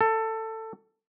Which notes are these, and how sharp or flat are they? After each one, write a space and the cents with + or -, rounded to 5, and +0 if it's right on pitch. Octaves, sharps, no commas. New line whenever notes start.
A4 +15